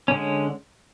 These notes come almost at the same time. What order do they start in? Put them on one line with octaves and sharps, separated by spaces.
C#4 D3 G#3